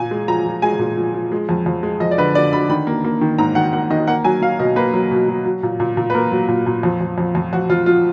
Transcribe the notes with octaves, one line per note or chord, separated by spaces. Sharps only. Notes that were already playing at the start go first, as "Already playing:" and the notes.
Already playing: A#2 G#5
G#3
F3 A#5
F3
G#3 G#5
A#2
F3
F3
G#3
F2
F2
G#3
F2 D#5
D5
D3 B4
D3 D5
D3 B5
D#3 B5
A#3
A#3
D#3
G#2 A#5
D#3 F#5
A#3 F#5
D#3 D#5
A#3 F#5
F#3 G#5
F#3 F5
B2 D#5
A#3 B4
F#3
B2
F#3
F#3
A#2
A#2
A#2
B4
A#3 A#4
F#3
A#2
A#2
F2
F2
F2
F2
F2 F#4
F2 F4
F3 F4